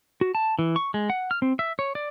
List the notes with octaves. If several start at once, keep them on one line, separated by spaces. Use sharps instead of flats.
F#4
A5
E3
C#6
G#3
F#5
F6
C4
E5
C#5
D5